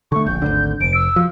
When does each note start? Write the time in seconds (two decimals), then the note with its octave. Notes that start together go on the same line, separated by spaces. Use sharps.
0.12 D3 A3 C#6
0.26 D#1 A#1 G6
0.42 G#1 D2 D3
0.81 F1 D7
0.94 E6
1.16 F3